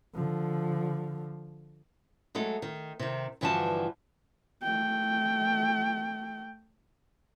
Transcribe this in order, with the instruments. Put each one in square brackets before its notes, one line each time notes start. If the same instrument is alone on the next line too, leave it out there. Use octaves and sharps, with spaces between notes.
[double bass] D3 F3
[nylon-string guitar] F#3 G#3 A3 A4
D#3
C3 D#3
G2 D3 E3 F3 F#4 A5
[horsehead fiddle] A3 G5